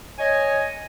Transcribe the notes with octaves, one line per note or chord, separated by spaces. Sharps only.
C#5 D#5 G#5